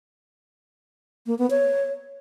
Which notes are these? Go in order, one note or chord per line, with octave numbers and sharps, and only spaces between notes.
A#3
B3
C#5